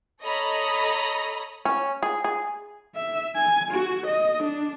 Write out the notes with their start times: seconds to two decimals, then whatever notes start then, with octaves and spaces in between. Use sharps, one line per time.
0.22 A4 C#5 D#5 A#5 B5 D#6
1.65 C#4
2.03 G#4
2.24 G#4
2.95 E5
3.36 G#5
3.72 F#4
4.06 D#5
4.43 D4